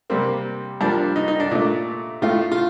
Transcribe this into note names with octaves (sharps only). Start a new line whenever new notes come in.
C3 G3 A#3 C4
G2 F3 A#3 D4
D#4
D#4
D4
A#2 A3
A2 A3 F4
F4